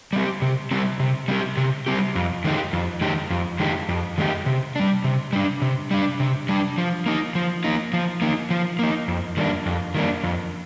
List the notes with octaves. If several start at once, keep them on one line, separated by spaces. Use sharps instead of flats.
G3 C4 G4
C3
G3 C4 G4
C3
G3 C4 G4
C3
G3 C4 G4
F2
D#3 G#3 D#4 G4
F2
D#3 G#3 D#4 G4
F2
D#3 G#3 D#4 G4
F2
D#3 G#3 D#4 G4
C3
G3 D4
C3
G3 D4
C3
G3 D4
C3
G3 D4
F3
A#3 D#4
F3
A#3 D#4
F3
A#3 D#4
F3
A#3 D#4
F2
D#3 G3 A#3 D4
F2
D#3 G3 A#3 D4
F2